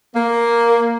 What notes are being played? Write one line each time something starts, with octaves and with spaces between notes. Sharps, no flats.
A#3